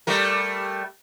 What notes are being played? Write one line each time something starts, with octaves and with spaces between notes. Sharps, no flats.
G3 A3 A#4